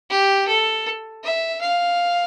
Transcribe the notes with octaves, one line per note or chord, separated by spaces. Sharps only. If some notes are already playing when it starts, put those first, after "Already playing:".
G4
A4
E5
F5